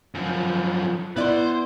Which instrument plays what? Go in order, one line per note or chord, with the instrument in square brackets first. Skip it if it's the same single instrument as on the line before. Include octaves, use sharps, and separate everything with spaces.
[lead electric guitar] F#2 F3
[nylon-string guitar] B3 E4 D5 [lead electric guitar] B4 C6